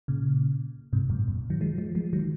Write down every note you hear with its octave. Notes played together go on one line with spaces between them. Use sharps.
A#2 C#3
G#2 C3
F#2 A#2
F#2
D#3 F#3
F3 G#3
F3 G#3
F3 G#3
D#3 F#3